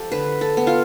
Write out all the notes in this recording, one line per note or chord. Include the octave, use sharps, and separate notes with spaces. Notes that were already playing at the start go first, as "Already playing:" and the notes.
Already playing: F3 G4 A4
D3 B4
A4
B3
F4